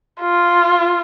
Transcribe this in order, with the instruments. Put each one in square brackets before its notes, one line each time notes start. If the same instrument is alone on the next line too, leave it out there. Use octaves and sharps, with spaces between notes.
[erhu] F4